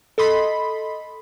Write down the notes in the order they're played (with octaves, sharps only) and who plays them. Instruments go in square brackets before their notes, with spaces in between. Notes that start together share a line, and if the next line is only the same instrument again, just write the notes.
[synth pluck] A4 D#5 B5 C6